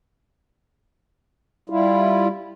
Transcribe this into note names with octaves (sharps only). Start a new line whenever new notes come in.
G3 E4 F4